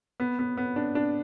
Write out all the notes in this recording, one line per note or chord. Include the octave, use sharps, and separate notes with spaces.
B3
B3
B3
D4
D4